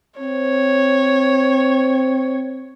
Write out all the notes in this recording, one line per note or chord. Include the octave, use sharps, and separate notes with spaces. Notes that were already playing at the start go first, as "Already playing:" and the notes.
C4 C#5